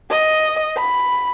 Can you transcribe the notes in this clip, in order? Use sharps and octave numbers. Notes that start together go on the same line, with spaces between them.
D#5
B5